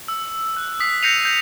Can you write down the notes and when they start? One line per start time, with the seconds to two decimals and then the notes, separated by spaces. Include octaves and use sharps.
0.08 E6
0.57 F#6
0.80 D#6 B6 C7
1.03 G6 A#6 C7 C#7 D#7 F7
1.25 G6 A#6